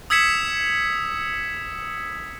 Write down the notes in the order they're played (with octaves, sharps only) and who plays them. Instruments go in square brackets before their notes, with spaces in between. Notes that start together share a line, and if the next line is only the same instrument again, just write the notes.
[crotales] D#6 E6 G#6 B6 C#7 E7